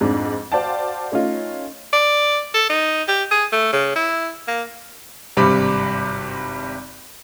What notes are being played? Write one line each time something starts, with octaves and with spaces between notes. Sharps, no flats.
F2 G#2 C4 D4
F#4 C5 D5 F5 G5 A5
A3 C#4 D#4 F4
D5
A4
D#4
G4
G#4
A3
C#3
E4
A#3
G#1 G2 C3 G3 B5 D6